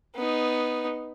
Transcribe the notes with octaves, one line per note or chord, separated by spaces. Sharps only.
B3 D#4